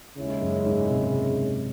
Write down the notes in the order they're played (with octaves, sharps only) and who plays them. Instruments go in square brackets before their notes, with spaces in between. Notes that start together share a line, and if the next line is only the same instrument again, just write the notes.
[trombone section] D#2 C#3 G#3 C#4 E4
[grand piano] F#2
G#2
C3